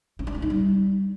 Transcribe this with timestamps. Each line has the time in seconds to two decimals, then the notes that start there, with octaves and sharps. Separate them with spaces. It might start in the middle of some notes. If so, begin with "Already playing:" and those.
0.19 C#4
0.27 D4
0.35 B3
0.42 D#4
0.50 G3